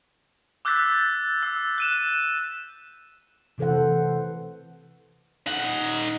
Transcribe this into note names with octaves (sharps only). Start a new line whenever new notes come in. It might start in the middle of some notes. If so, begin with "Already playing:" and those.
D6 E6 F#6 G6 A6 B6
E6
F#6 D#7 E7
C3 E3 A4 C5 F#5
D#4 F#5